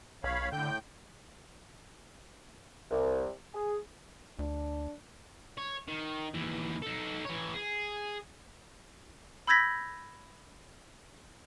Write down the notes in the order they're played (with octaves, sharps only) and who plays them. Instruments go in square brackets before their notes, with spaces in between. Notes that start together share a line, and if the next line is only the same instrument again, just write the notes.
[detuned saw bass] B1 [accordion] C#5 F5 B5
[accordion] A2 G5 G6 [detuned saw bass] D3
[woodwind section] C2
G#4
[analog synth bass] D2 [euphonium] D4
[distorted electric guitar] C#5
D#3
D#2 E3
D#4 A4
E3 C#5
G#4
[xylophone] B5 E6 G6 G#6 A#6 B6